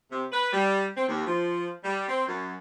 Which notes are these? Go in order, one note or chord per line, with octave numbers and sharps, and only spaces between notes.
C3
B4
G3
C4
D#2
F3
G3
C4
F#2